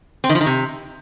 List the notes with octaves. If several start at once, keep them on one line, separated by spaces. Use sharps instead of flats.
C4
D#3
F3
D#3
C3